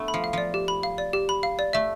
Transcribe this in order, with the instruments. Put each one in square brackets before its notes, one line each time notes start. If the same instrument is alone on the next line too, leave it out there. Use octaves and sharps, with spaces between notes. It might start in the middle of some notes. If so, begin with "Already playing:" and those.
Already playing: [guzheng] A3 B3 D4
[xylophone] B5
[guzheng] F3
[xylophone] F5
[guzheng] F3 [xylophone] D5
[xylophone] G4
B5
F5
D5
G4
B5
F5
D5
[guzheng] A3 [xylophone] E5